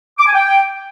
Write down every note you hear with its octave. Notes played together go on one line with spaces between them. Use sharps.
D6
G#5
G5